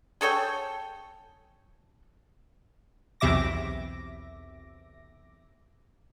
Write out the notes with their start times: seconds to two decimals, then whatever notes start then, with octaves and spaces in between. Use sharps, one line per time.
0.21 G#4 A4 C#5 G5
3.20 B1 E2 C3 E5 D6 A#6